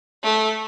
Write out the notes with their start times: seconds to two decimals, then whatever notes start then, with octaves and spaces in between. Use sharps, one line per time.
0.23 A3